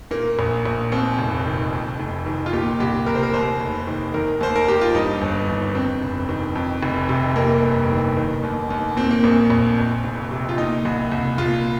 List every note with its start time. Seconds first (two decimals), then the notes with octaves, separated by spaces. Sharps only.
0.11 A#2 A#3
0.39 A#1
0.65 A#1
0.92 D#2 C4
1.19 F1
1.46 D#3
1.73 F2
2.00 F1
2.26 D#3
2.46 F4
2.53 A#2 G4
2.80 C2 G4
3.06 C2 A#4
3.15 C5
3.23 A#4
3.34 D#2 C5
3.61 F1
3.87 D#3
4.14 D#3 A#4
4.41 D#2 C5
4.56 A#4
4.68 D#2 G4
4.81 F4
4.95 G2 D#4
5.21 G1
5.48 D#3
5.75 F2 C4
6.02 F1
6.29 D#3
6.55 F2
6.83 F1
7.09 C3
7.36 F2 A#3
7.63 G1
7.90 D#3
8.17 D#3
8.43 D#2
8.70 D#2
8.97 A#2 C4
9.11 A#3
9.24 A#1 C4
9.50 A#1
9.78 F2
10.04 F1
10.31 C3
10.49 F4
10.58 A#2 D#4
10.85 C2
11.12 C2
11.38 A#2 F4